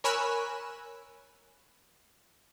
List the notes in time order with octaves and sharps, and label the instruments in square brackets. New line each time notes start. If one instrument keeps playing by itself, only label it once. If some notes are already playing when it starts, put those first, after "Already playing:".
[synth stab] A#4 C#5 G#5 B5 E6 F#6